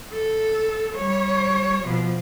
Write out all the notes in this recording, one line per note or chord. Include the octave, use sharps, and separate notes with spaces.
A4
G3 C#5
B2 F3